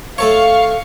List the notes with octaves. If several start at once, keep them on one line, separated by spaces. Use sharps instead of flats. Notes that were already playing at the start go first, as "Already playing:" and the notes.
A3 A4 C#5 F5 C#6